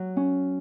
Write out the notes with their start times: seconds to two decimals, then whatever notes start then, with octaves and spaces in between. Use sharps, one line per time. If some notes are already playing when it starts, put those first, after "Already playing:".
Already playing: F#3
0.17 C#4